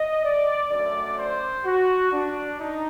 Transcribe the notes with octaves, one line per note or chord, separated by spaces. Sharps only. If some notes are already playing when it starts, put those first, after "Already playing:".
Already playing: D#5
D5
F#2 D3 A3 D5
C5
F#4
D4
D4 D#4